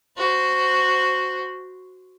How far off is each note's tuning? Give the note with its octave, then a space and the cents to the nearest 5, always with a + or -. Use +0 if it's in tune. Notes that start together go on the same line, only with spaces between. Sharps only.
F#4 +0 C5 -15